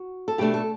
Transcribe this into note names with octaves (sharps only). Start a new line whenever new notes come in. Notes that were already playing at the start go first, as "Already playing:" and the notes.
Already playing: F#4
A4
B2 A3 D4 G4
A4